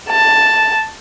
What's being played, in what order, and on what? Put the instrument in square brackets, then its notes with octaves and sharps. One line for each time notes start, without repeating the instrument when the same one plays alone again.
[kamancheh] A5